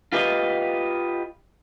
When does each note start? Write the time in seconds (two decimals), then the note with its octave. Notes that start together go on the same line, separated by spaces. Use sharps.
0.13 F4 G4 B4 D#5 F5